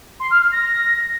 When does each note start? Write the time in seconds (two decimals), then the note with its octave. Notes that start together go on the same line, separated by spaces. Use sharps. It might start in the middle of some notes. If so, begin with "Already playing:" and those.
0.20 C6
0.31 F6
0.41 F6
0.52 A#6